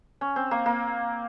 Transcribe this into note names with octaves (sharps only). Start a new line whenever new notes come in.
C#4
C4
A#3
A#3